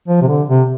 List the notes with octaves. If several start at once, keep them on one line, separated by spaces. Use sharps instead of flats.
F3
C3
D3
C3